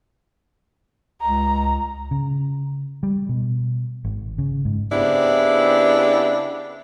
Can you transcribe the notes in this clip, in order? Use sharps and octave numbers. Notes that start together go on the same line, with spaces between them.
C#2 A#5
C#3
G3
B2
G#1
C#3
G#2
C#3 B3 C4 D4 E4 G4